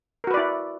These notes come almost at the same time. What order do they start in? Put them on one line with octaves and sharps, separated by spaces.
A#4 F#4 B4 D5 E4